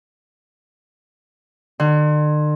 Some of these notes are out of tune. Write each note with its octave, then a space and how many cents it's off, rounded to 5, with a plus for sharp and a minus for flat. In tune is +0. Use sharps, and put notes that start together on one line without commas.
D3 +45